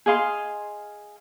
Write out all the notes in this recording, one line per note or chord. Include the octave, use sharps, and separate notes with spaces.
G#4 D#5 F5 C6